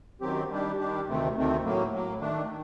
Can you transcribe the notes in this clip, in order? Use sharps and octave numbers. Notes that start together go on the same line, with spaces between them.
F#2 D#3 F#3 C4 G4
D#3 G3 D4 G4
D#3 G3 D4 G4
D2 C3 D#3 A3 C4
D2 C3 D#3 A3 C4
A2 F#3 A#3
A2 F#3 A#3
D#3 A3 D4
D#3